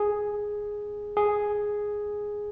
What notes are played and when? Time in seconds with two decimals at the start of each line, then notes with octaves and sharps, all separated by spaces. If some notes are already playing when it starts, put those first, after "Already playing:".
Already playing: G#4
1.17 G#4